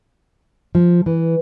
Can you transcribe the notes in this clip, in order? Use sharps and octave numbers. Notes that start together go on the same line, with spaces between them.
F3
E3